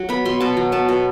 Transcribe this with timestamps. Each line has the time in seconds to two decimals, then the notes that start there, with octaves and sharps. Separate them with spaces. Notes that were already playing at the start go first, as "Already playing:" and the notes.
Already playing: F#3
0.09 B3 B5
0.25 B2 C6
0.40 B2 A5
0.57 F#3
0.72 B3 A5
0.89 B2